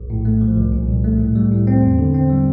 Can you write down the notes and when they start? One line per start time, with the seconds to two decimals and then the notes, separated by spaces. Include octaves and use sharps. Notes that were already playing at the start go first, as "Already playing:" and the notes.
Already playing: A#1
0.10 A2
0.25 A3
0.41 F3
0.57 C2
0.73 A#2
0.88 C2
1.04 A3
1.20 A2
1.35 G3
1.51 A2
1.67 C4
1.83 E2
1.99 D3
2.14 C4
2.30 G3